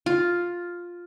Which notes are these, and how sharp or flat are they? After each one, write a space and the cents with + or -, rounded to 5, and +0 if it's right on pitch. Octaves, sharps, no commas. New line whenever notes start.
F4 +5